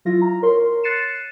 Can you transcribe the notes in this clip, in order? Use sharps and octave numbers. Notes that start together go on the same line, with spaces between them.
F#3 E4 F4 A#6
A#5
A#4 C#5 C6
F#6 A6 C7 C#7 D#7 E7